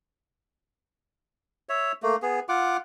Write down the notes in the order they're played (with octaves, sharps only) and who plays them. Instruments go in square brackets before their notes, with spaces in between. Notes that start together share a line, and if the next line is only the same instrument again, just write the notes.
[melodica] C#5 E5
A3 A#3
B3 G#4
F4 F#5 D6